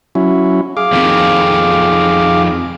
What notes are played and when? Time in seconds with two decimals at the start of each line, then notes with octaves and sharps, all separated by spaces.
0.15 F#3 C#4 E4
0.77 G#4 F5 D6
0.93 F2 D#3